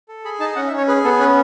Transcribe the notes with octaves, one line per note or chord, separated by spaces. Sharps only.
A4
G#4 B5
D#4 A5
C#4 F#5
E5
C#4 C#5
G#4 B4
B3 A4
C#4 B4